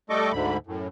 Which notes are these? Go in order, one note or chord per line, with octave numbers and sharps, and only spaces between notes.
G3 A3 A4 D#5 C#6 D6
D2 G#2 D3 B5
F#2 A2